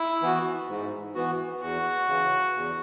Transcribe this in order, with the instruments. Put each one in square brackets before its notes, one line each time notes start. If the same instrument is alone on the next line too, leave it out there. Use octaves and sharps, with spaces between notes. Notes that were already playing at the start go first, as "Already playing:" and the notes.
Already playing: [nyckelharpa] E4
[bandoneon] E3 B3 F#4
G#2
E3 B3 F#4
[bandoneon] E2 [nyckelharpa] F#4
[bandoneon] C#3 E3
E2